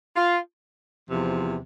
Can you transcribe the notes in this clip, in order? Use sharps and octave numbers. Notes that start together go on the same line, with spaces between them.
F4
E2 C3 F3